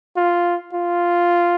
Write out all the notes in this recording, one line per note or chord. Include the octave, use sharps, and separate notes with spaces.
F4
F4